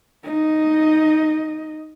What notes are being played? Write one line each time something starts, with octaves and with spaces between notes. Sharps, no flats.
D#4 D#5